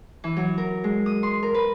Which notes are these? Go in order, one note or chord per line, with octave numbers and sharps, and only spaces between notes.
E3
F#3
A#4
G#3
D#6
C6
A#4
B4